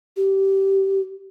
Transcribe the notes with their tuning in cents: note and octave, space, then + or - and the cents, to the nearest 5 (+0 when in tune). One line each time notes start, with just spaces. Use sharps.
G4 -20